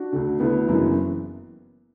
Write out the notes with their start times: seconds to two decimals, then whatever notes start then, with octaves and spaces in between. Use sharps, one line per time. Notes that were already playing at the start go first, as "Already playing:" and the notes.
Already playing: D4 F#4
0.13 D2 D3
0.40 D2 D3 B3 E4
0.69 F#1 F#2 E3